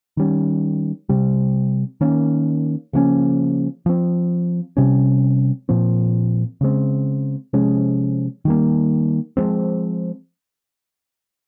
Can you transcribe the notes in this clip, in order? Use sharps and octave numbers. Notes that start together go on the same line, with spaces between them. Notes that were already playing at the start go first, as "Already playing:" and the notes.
D#3 G3 C#4
C3 G3 C4
D#3 A#3 C#4
C#3 F3 A#3 C#4
F3 C4
C3 G3 C#4
A#2 F3 C4
C#3 G#3 C4
C3 F3 G#3 C#4
D#3 G3 A#3
F3 G#3 C4